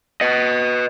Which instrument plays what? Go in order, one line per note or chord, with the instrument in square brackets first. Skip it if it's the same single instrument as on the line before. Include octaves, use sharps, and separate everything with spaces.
[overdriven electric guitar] B4 D#5